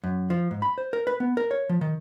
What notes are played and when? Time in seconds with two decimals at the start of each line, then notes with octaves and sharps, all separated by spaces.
0.04 F#2
0.30 F3
0.51 G#2
0.62 B5
0.78 C5
0.93 A#4
1.07 B4
1.20 B3
1.37 A#4
1.51 C#5
1.69 F3
1.81 D#3